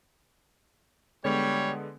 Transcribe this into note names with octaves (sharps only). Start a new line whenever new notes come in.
D3 G3 G#3 B3 C#5